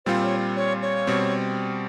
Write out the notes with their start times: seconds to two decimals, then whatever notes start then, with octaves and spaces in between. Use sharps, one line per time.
0.06 A#2 G3 C4 F4 C5
0.23 C#5
0.56 C#5
0.82 C#5
1.07 B2 G3 C4